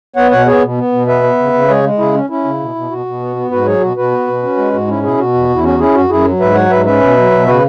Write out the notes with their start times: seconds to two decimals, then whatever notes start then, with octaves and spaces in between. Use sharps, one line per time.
0.16 B3 C#5 F#5
0.31 B2 C#5 F#5
0.46 B3 G#4 C#5
0.63 B2
0.78 B3
0.92 B2
1.07 B3 B4 E5
1.23 B3
1.39 C#3
1.53 C#3
1.68 G#3 G#4 C#5
1.84 G#3
1.98 C#3 E4 G#4
2.14 C#4
2.30 C#4 E4
2.44 C#3
2.60 B2
2.75 B2
2.90 B2 F#4
3.06 B2
3.20 B3
3.36 B3
3.51 G#2 F#4 B4
3.66 F#3 G#4 C#5
3.81 B2 F#4
3.96 B2 F#4 B4
4.11 B3
4.27 B2
4.43 C#4
4.57 G#3
4.73 G#2 F#4
4.88 C#4 E4
5.03 B2 E4 G#4
5.18 B2 F#4
5.34 E2
5.49 E2
5.55 E4
5.63 C#4 F#4
5.79 C#4 E4 G#4
5.94 F#2 F#4
6.09 F#2 E4 G#4
6.24 F#3
6.40 G#2 B4 E5
6.55 F#3 C#5 F#5
6.70 G#2 B4 E5
6.85 C#4 B4 E5
7.01 B2
7.17 F#3
7.31 B2
7.46 C#3 F#4 B4